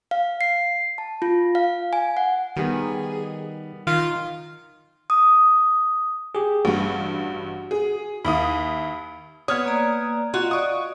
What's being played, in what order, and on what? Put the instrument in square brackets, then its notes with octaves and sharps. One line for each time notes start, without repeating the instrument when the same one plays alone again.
[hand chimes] F5
C7
A5
F4
F5
G#5
F#5
[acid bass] D#3 [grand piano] G3 B3 [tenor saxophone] G#4
[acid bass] D#3 [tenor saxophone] F4
[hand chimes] D#6
[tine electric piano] G4 G#4
[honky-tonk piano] A1 G2 [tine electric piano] F#4
[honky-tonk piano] G#4
[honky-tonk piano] D#2 E4 D#6 [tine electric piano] B5
[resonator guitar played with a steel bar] B3 C#5 [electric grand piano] D#6 F6 G#6
[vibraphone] A#3 D5 A#5
[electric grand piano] F4 [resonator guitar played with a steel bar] F#4 [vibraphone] D#5 F5
[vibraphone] D5 D#5 [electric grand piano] C#6 D#6